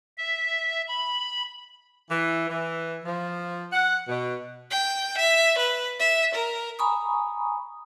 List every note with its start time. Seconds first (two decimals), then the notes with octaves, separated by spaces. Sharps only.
0.18 E5
0.88 B5
2.11 E3
2.49 E3
3.05 F3
3.73 F#5
4.08 B2
4.71 G5
5.18 E5
5.58 B4
6.00 E5
6.35 A#4
6.79 G#5 A#5 B5 C#6 D#6